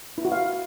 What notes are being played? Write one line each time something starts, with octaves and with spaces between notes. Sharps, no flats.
E4
F#4
F5